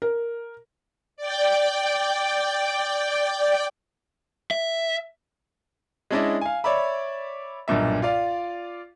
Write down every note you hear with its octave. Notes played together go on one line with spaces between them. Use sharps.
A#4
D5 G5
E5
G#3 C#4 D4 E4 D5 D#5
F5 G#5
C#5 D5 E5 B5
B1 G2 A#2 E5
F4 D5 F5